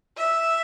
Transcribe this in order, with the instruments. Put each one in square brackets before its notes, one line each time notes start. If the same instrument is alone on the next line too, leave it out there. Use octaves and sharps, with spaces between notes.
[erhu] E5